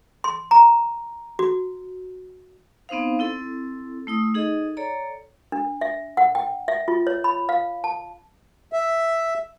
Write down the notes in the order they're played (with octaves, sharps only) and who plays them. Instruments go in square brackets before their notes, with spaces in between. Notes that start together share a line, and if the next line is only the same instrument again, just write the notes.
[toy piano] C6
A#5
F#4
[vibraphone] B3 C4 D#4 C5 F5
C4 E4 A4
A3 E4 D#6
D#4 G#4 A4 D#5
A4 C#5 D5 A#5
[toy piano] D4
E5
F#5
G5
E5
F4
C#5
B5
F5
A5
[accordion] E5